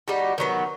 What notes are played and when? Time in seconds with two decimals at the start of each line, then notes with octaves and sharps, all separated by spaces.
0.08 G3 D#4 F#4
0.38 D#3 F#3 B3